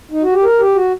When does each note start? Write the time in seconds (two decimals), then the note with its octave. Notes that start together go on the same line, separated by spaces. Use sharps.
0.11 D#4
0.23 F#4
0.33 G4
0.44 A#4
0.60 G4
0.75 F#4